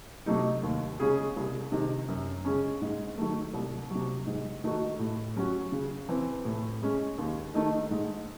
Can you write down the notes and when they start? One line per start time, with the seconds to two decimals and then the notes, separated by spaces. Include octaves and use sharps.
0.26 C3 F#3 A3 D#4
0.63 D#2
0.99 C#3 G#3 C#4 G#4
1.36 C2
1.72 C3 D#3
2.08 F#2
2.45 C#3 G#3 C#4
2.82 G#2
3.18 D#3 F#3 A3
3.54 C2
3.90 F#3
3.95 C3
4.27 G#2
4.64 D#3 A3 D#4 F#4
4.99 A2
5.36 F#3 C#4 F#4
5.72 C#3
6.09 E3 C4
6.45 A2
6.82 G#3 C#4
7.18 D#2
7.54 D#3 A3 D#4
7.91 G#2